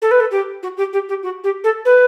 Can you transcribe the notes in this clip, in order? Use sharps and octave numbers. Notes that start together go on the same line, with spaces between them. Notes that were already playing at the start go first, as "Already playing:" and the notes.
A4
B4
A4
G4
F#4
G4
G4
G4
F#4
G4
A4
B4